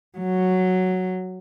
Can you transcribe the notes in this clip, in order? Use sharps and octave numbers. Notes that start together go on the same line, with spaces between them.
F#3